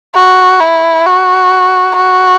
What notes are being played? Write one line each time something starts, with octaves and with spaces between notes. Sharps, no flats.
F#4
E4
F#4
F#4